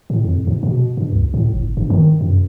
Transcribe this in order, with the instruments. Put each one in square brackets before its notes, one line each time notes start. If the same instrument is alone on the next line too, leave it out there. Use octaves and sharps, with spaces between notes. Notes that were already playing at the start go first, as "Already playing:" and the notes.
[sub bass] A2
F2
G#2
B2
G2
C#2
A2
G1
G2
D#3
F#2